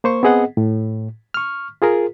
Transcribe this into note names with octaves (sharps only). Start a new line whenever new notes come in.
A#3 C5 C#6
B3 C4 G#4 D#5 F#5
A2
C#6 F6
F4 G#4 A#4